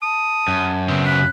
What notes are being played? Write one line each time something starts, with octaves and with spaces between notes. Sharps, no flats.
A5 D#6
F#2
C#3 B3 C4
B5 F#6